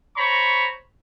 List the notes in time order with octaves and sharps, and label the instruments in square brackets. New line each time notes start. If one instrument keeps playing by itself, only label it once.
[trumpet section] C5 C#5 A#5 B5 C#6